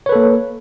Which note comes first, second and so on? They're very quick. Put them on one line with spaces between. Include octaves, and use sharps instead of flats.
C#5 B4 A4 A#3